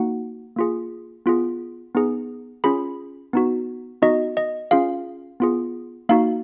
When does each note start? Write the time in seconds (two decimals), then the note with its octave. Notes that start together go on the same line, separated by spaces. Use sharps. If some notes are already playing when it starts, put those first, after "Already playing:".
Already playing: A#3 D#4 F#4 F#5
0.56 A#3 F4 G#4
1.26 B3 F4 G#4
1.95 B3 D#4 G#4
2.64 C#4 F4 G#4 B5
3.33 B3 D#4 F#4
4.02 B3 D#4 F#4 D#5
4.37 D#5
4.71 C#4 F4 G#4 F5
5.40 B3 F4 G#4
6.09 A#3 D#4 F#4 F5